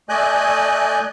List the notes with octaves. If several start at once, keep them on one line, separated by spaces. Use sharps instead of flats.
A3 D5 D#5 G#5 F#6 G6